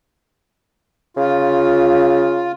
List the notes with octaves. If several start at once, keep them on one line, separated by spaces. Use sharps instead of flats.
C#3 F4